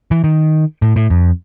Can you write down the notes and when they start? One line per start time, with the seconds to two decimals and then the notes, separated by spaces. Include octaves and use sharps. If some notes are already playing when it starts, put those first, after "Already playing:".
0.11 E3
0.24 D#3
0.82 A2
0.96 A2
1.10 F2